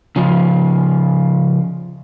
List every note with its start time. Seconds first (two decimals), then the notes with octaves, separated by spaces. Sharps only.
0.16 C#3 F3